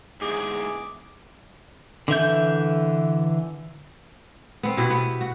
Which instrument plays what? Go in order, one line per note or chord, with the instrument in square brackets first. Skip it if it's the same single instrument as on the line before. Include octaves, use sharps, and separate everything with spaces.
[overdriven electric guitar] E2 G#2 [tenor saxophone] G#4 [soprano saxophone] D6
[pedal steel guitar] D3 E3 E5 G6
[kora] B3 C4
B2 E4 F#4 G4
B3
F#4